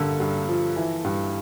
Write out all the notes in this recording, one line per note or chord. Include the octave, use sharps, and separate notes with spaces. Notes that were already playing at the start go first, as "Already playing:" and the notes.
Already playing: G2 D3 A4 A#4
G2
F3
E3
G2